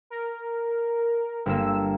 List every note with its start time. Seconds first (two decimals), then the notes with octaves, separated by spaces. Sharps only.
0.10 A#4
1.46 G1 A#3 E6